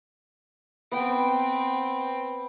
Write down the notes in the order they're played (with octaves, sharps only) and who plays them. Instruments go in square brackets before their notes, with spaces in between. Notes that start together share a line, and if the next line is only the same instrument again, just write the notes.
[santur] B3 [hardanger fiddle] C4 G5